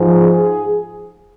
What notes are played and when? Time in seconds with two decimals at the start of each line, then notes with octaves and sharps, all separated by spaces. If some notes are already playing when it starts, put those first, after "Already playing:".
Already playing: G#2 F3
0.20 G#4